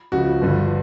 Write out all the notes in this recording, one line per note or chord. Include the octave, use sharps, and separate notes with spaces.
C#2 C#3 F3 F#4
G1 G2 D3 F3